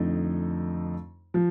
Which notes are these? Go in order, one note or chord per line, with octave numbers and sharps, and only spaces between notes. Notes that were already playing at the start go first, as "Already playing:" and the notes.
Already playing: F2 D3 A3 D#4
F3